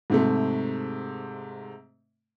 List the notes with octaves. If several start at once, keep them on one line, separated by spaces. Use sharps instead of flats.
G#2 C3 A3